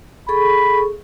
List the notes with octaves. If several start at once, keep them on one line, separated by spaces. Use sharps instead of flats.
G#4 A4 B5 C#6